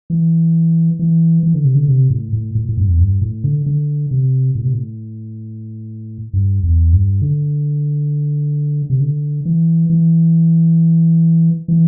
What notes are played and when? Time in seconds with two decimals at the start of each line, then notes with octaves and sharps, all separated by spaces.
0.10 E3
0.99 E3
1.43 E3
1.54 D3
1.65 C3
1.75 D3
1.88 C3
2.10 A2
2.33 A2
2.55 A2
2.69 A2
2.77 G2
2.89 E2
3.00 G2
3.22 A2
3.44 D3
3.66 D3
4.11 C3
4.55 A2
4.64 C3
4.74 A2
6.33 G2
6.63 E2
6.93 G2
7.22 D3
8.90 C3
9.00 D3
9.45 E3
9.90 E3
11.68 E3